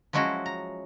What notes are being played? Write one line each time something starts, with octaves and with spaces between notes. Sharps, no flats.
F3 F#3 G#3 C#4 E4 F#4
A#5